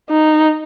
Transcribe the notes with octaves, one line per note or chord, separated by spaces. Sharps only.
D#4